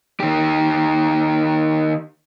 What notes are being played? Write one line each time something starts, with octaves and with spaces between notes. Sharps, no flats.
D#3 G4